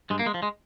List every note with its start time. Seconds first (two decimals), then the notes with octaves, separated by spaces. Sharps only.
0.10 G2 G#3
0.19 A#3
0.26 G#3
0.34 F3
0.43 G#3